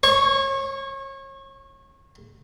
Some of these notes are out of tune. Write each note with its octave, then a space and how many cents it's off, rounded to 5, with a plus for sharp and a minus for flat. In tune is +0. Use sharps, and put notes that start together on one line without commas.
C#5 -35 C#6 +0